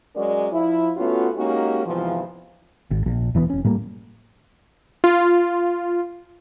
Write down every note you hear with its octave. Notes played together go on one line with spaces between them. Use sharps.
F#3 G#3 C#4 A#4 D5
F3 E4
A3 B3 C#4 F4 F#4
G#3 A#3 C#4 D#4 F#4 G4
E2 G#2 C3 E3 F3
G#1
A#1
E1 E3 G#3 B3
F1 C#4
A2 G3 A#3
F4